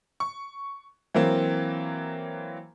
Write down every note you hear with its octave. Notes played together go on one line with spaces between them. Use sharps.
C#6
E3 F#3 A#3 C4